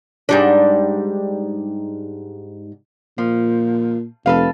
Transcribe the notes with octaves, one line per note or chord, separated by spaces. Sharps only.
G#2 G3 D4
A#2 F3
F1 A4 B4 F5